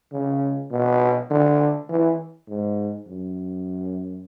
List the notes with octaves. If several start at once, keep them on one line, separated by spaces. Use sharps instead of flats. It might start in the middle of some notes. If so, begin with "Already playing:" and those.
C#3
B2
D3
E3
G#2
F#2